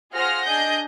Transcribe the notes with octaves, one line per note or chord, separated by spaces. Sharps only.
F4 G#4 C5 F#5 F6 A#6
D4 G#4 D#5 G6